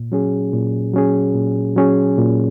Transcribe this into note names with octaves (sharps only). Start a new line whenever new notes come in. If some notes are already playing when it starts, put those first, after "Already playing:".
Already playing: A#2
F#3 C#4 G#4
A#2
F#3 C#4 G#4
A#2
F#3 C#4 G#4
A#2